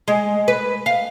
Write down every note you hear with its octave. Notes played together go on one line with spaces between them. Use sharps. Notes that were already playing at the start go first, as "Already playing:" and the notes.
G#3
B4
F5